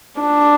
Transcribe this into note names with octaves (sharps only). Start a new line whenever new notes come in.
D4